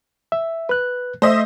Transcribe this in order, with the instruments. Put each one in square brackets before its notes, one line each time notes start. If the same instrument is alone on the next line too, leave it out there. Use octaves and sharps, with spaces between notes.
[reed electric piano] E5
B4 F#6
[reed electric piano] A3 [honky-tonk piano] C5 D#5 E5